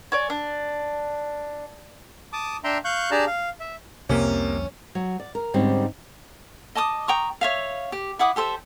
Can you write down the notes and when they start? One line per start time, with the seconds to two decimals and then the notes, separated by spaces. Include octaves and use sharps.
0.12 C#5 D5 G#5
0.30 D4
2.33 A5 D6 D#6
2.64 D4 E5 G5 A#5 C6
2.85 F5 C#6 F#6 G6
3.11 D4 G4 G#4 D5 A5 A#5
3.27 F5
3.60 E5
4.09 C2 F2 C3 F3 A#3 C#4
4.95 F#3
5.20 D5
5.35 A#4
5.54 G#2 D3 G3 C4 C#4 D#4
6.75 D#5 A5 D6 D#6
7.08 G5 A#5 C#6 D#6
7.41 C#5 E5 F5
7.92 G4
8.19 E4 F#5 D6 D#6
8.36 G4 A4 C5 E5